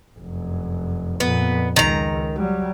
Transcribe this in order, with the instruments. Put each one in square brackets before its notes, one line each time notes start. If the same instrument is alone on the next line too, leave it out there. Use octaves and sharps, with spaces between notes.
[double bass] F1 F#2
[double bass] F2 A#2 [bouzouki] B3
[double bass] C#2 [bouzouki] D#3 A#5
[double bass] F#3 G3